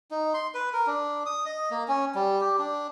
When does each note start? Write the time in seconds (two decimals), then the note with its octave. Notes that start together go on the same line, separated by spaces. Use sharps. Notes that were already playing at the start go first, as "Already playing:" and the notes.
0.11 D#4
0.34 C6
0.54 B4
0.73 A#4
0.87 D4
1.26 D#6
1.46 D#5
1.71 A#3
1.88 C#4
2.15 G3
2.41 G4
2.59 D4